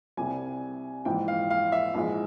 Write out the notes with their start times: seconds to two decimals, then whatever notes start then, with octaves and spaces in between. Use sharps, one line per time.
0.17 C2 C3 G3 G#5
1.05 A#1 G#2 E3 G5
1.28 F5
1.50 F5
1.72 E5
1.95 A#1 G#2 E3 G#3